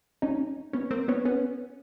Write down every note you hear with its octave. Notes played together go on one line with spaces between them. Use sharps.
C#4 D#4
B3 C#4
A#3 C4
B3 C#4
B3 C#4